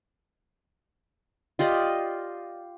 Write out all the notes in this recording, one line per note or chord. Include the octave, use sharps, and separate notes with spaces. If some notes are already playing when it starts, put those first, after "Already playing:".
F4 G4 D5 D#5